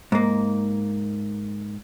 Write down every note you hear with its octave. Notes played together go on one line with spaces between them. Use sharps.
G#2 A#3